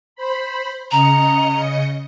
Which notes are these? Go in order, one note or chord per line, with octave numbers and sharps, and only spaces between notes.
C5 B5
C#3 D#5 A#5 C#7